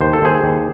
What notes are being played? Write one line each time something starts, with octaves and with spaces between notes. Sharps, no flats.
D#2 C5
A4
D#2 G#4 C5
D#2